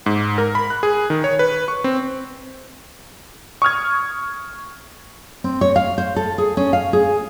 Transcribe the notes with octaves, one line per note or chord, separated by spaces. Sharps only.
G#2
A#4
B5
F#6
G#4
D#3
C#5
B4
C#6
C4
C#6 D#6 F6 G#6
C4
C#5
F5
C5
A4
G#4
C#4
F5
G#4